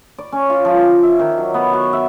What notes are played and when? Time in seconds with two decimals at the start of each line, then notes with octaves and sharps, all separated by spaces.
0.18 D5
0.32 C#4
0.50 F4
0.65 F3
0.77 D6
1.03 E5
1.19 D#3
1.38 F#3
1.54 B3
1.73 F#4
1.93 E5